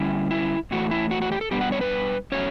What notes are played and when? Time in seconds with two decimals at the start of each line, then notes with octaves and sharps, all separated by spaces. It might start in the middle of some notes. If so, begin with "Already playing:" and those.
Already playing: D3 G3 C#4 E4
0.31 E4
0.71 A2 E3 A3 F#4
0.91 E4
1.11 F#4
1.22 F#4
1.32 G4
1.41 A4
1.51 B2 G3 B3 D4 G4
1.61 F#5
1.72 C#5
1.81 B4
2.32 B2 F#3 A3 C#4 C#5